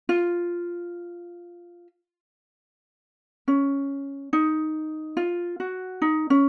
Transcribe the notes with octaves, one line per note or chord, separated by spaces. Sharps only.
F4
C#4
D#4
F4
F#4
D#4
C#4